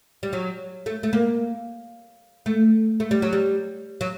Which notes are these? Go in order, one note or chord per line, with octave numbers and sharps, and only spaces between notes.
G3
F#3
A3
A3
A#3
A3
A3
G3
F#3
G3
F#3